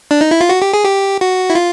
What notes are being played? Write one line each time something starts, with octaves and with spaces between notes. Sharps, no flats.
D4
D#4
E4
F4
F#4
G4
G#4
G4
F#4
E4
F4